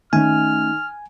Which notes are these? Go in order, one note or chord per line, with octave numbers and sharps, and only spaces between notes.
D#3 A3 C#4 G#5 F6